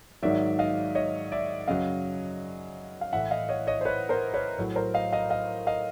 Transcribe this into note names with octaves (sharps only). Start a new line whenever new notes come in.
G#2 D#3 F#3 D5 E5
D#5 F5
C#5 D#5
D5 E5
F#2 C#3 F#3 D#5 F5
F5
A2 E3 E5 F#5
D#5 F5
C#5 D#5
C#5 D#5
C5
B4 C#5
A#4 C5
B4 C#5
A2 F#3
A#4 C5
D#5 F5
D#5 F5
D#5 F5
D#5 F5